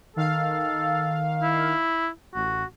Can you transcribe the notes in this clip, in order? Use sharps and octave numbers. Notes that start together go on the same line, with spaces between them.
D#3 A4 F5
E4
A1 F#4